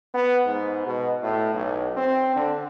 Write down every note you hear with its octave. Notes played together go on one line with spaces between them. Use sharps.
B3
G#2
B2
A2
B1
C4
D3